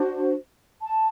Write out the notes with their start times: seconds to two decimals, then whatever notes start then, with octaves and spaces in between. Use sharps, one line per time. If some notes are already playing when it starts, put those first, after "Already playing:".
Already playing: D4 F#4 C5
0.83 A5